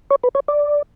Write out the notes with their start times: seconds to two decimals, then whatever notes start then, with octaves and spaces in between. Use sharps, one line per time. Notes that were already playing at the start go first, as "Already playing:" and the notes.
0.11 C#5
0.24 B4
0.35 C#5
0.48 D5